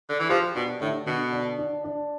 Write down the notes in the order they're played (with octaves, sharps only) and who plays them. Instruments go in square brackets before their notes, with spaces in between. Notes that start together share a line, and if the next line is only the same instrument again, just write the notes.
[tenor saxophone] D3
E3
[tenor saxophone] F3 [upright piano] G4
[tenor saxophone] B2 [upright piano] D4
[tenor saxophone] A2 [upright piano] D3
[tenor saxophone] B2 [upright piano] D3
[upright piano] D4
D4
D4